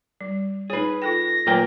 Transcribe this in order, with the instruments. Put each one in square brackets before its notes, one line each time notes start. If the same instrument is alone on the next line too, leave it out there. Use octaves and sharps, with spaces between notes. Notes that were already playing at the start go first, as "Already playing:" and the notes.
[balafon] G3
[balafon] D#4 C#5 [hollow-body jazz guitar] G#4 B4
[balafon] F4 A4 G5 [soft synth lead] A#6
[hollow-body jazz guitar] A#2 A#4 G5 [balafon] F#3 B4 C#5